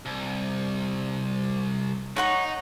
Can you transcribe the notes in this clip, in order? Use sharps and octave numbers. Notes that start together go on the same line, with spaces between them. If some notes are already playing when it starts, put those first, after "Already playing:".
C2
D#4 C#5 F#5 C#6